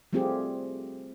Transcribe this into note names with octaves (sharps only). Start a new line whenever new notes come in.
G3 A3 C4 F4 G4 G#4